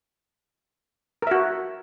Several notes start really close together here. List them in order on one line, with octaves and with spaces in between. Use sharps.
A#4 E5 F#4